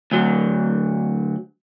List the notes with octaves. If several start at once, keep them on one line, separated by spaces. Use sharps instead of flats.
D2 F#3